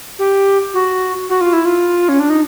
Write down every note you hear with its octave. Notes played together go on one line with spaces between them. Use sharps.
G4
F#4
F#4
F4
E4
F4
C#4
D4
D#4